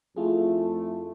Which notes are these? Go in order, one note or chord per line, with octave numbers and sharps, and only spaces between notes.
F2 A3 E4 F4 G#4